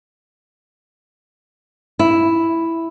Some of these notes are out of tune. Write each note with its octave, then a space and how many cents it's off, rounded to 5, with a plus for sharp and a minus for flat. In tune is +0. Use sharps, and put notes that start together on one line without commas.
E4 +0